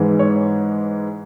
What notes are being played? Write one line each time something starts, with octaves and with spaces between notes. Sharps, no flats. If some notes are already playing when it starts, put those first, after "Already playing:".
Already playing: G#2 E3 G#3
C#5